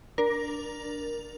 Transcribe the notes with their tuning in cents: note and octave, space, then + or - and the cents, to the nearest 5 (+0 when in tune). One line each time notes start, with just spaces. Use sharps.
D4 +0 A#4 +15